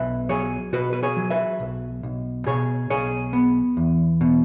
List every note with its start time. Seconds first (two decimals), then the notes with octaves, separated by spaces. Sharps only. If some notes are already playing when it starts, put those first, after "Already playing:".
Already playing: B1 B4 E5
0.29 F#3 G#4 C#5
0.73 B2 F#4 B4
0.93 B4
1.03 G#4 C#5
1.17 F#3
1.30 B4 E5
1.60 B1
2.03 B1
2.47 B2 G#4 C#5
2.90 B1 G#4 C#5
3.33 B3
3.77 E2
4.21 B2